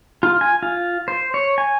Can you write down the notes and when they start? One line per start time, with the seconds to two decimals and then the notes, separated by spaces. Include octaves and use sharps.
0.23 F4
0.41 G#5
0.63 F4
1.08 C5
1.34 C#5
1.58 G#5